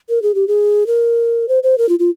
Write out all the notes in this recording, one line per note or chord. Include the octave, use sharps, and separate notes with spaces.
A#4
G#4
G4
G#4
A#4
C5
C5
A#4
F4
F4